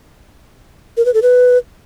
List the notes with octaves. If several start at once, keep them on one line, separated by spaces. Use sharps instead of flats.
A#4
B4
A4
B4